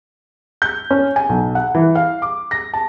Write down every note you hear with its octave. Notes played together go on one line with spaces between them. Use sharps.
G6
C#4
G#5
B1
F#5
E3
F5
D6
A#6
A5